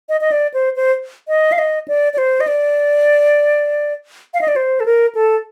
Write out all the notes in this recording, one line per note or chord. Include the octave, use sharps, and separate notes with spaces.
D#5
D#5
D5
C5
C5
D#5
F5
D#5
D5
D5
C5
D#5
D5
F5
D#5
D5
C5
A4
A#4
A4